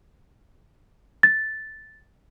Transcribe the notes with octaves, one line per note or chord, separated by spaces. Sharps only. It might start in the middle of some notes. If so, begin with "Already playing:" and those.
A6